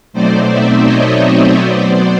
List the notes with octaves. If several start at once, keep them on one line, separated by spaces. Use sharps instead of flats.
B2 F#3 A3 C4 D#4 C5 D5
D5 E5
C#5 D#5
C5 D5
B2 F#3 B3